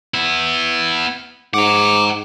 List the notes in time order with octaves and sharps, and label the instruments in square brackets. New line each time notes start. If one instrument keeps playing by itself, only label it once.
[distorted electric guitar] B3 E4
[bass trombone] G#2 [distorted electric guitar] F#5 A#5 [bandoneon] D6